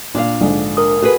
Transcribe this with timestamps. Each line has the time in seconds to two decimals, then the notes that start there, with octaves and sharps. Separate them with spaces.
0.15 A#2 D4 F5
0.41 A#1 G#2 D3
0.77 A#4 D#6
1.02 F#4 G#4 A4 B4